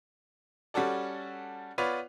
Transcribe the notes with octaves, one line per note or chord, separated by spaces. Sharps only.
G3 C#4 F#4 A4 D5
B3 F4 B4 C#5 D5